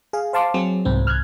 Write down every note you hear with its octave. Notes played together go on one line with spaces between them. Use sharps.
G#4 F5
C5 F5 A5 C6 D6
F#3 C4 G#4
C2 G#2 C4
C2 F6 F#6 G#6